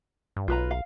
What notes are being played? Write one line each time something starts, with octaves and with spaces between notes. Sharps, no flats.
G2
B1 F4 B4 A#5
F5